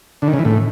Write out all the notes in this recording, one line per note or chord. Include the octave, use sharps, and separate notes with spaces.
D3
D#3
C#3
E3
A2